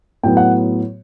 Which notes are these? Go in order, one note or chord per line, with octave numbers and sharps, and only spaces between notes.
A2 F#3 B3 G5
F#5